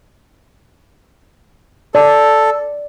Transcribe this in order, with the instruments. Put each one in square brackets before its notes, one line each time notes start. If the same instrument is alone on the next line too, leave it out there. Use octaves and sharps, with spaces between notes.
[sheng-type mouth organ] A4 [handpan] D5